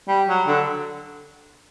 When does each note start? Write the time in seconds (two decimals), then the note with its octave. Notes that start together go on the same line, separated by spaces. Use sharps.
0.08 G3
0.28 F#3
0.47 D3